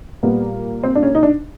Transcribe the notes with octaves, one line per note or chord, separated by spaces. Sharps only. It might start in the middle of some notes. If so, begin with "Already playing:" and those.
A#2 G3 A#3 B3
C4
D4
C#4
D#4
D4